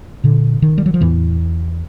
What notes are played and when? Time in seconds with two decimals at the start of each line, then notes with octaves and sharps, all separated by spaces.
0.24 A#2 D3
0.62 D#3
0.78 G3
0.86 F#3
0.94 F3
1.01 E2 A2 E3